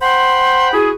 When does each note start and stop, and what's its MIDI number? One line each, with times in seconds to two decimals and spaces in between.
0.02 0.72 72
0.02 0.72 78
0.02 0.72 79
0.02 0.72 83
0.02 0.72 84
0.73 0.90 64
0.73 0.90 66
0.73 0.90 68